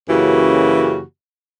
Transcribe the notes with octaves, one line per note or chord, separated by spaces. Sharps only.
F#2 C#3 E3 A#3 F#4 G4